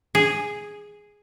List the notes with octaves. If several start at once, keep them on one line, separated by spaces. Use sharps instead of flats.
G#4